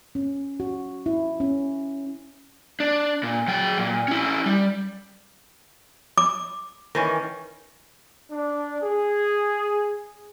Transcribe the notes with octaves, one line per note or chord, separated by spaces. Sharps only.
C#4
F#4
E4
C#4
D4
A#2
F#3 G5
A#2
C#4 E4
G3
D6
D#3 E3 C#4
D4
G#4